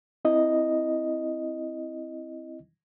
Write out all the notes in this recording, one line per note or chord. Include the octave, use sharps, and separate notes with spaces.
C4 E4 D#5